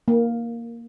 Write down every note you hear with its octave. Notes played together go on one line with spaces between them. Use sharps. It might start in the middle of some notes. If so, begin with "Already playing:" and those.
A#3